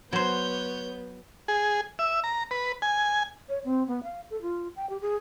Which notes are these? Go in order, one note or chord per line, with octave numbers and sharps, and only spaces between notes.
F#3 B3 C5 C#5 G6
G#4
E5
A#5
B4
G#5
C#5
C4
B3
F5
A4
F4
G5
G4
G#4